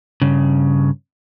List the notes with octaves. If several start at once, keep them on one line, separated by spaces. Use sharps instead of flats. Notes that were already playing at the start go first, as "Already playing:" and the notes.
G2 C#3